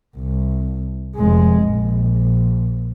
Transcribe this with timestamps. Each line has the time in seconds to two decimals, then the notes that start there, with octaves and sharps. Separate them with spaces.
0.18 C2
1.16 F1 G#3
1.63 A#1